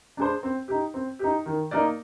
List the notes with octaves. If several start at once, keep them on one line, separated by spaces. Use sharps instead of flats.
D4 G#4 C5
C4
D#4 G4
C4
D#4 G4
D#3
A#3 D#4 A#4 D5